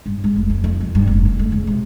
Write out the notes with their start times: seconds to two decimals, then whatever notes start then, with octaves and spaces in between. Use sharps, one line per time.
0.06 G2
0.24 G#3
0.36 F1
0.50 F2
0.64 F2
0.80 C2
0.95 G2
1.07 F1
1.25 C#3
1.39 A3
1.52 C#2
1.67 C3